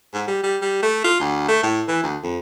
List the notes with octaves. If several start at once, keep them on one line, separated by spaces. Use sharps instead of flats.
G#2
G3
G3
G3
A3
F4
D2
A3
A2
E3
D2
F2